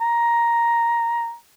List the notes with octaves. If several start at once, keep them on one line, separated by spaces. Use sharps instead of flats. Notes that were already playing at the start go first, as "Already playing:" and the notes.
A#5